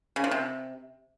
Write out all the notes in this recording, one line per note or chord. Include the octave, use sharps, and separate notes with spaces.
C#3
F3
C3